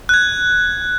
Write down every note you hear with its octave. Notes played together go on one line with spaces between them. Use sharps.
F#6 G#6